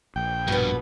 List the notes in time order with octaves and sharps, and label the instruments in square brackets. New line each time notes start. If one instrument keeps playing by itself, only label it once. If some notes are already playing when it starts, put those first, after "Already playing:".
[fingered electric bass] A#1 [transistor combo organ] G5
[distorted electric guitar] G2 [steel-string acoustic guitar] B2 B3